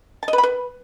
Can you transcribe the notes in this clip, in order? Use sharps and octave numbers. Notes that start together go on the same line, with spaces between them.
A5
D#5
B4
B5
B4